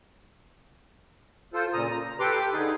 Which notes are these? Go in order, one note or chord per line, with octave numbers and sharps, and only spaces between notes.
F4 A4 C5
A#2 C#3 A#5 D#6
A#5
G4 A4 B4 C6 D6
G5
D3 D#4 G#4